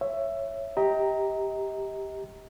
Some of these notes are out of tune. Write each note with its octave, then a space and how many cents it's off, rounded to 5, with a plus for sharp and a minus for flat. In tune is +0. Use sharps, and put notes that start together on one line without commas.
C#5 +0 E5 +15
G4 +0 D#5 +35 A#5 +0